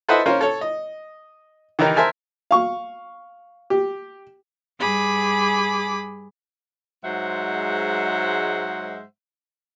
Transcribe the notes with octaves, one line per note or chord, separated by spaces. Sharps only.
A4 B4 C5 D#5 E5 F#5
C#4 F4 A#4 C5
A4 C#5
D#5
D#3 E3 D#4 G4 A#4
A#4 C5 E5 G#5 A5
F5 C#6
G4
G2 G#4 B5 D6
G#2 F#3 G#3 C5 E5 F#5